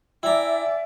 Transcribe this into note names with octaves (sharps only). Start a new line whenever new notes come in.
E4 D5 E5 G5 G#5 A#5 D6